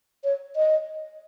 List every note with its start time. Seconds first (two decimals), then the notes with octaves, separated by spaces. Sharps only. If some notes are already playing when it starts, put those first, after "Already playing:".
0.24 C#5
0.56 D#5